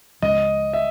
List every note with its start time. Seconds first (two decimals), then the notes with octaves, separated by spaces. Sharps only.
0.22 C#2 C#3 F3 G#3 D#5
0.73 E5